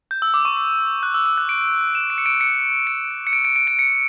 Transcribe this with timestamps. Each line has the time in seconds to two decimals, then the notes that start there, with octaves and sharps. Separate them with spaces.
0.11 G6
0.22 E6
0.34 D6
0.45 C#6
0.57 D6
1.03 F#6
1.14 E6
1.26 E6
1.38 F#6
1.49 D7
1.95 E7
2.10 D7
2.18 C#7
2.26 D7
2.41 C#7
2.87 D7
3.27 C#7
3.33 D7
3.45 D7
3.56 D7
3.67 D7
3.79 C#7